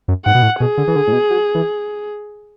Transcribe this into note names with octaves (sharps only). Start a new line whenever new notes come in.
F#2
G#2 F#5
B2
A2
B2 G#4
D3
E3
D3
A2
B2
F#3
E3